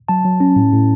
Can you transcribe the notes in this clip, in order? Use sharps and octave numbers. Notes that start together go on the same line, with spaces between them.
F#3 A5
F#3
C#4
A2
A2